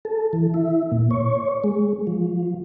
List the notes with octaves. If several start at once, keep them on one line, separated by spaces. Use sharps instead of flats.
A4
E3
E4
A#2
C#5
G#3
F3